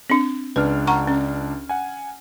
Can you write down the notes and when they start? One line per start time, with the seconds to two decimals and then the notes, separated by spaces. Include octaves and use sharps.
0.10 C4 D4
0.56 C#2 D4 B4 F6
0.87 F#5 A#5 C#6
1.07 C#4
1.69 F#5 G#5